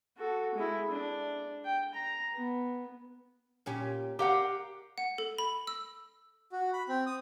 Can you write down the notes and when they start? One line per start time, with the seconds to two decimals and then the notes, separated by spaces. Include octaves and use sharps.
0.18 F#4 A4
0.55 G#3 E4
0.91 D4
1.65 G5
1.94 A#5
2.35 B3
3.66 A#2 C#4 G4
4.19 G4 A#4 F5 F#5
4.98 F#5
5.18 A4
5.38 B5
5.67 E6
6.52 F#4
6.73 B5
6.88 C4
7.06 D#6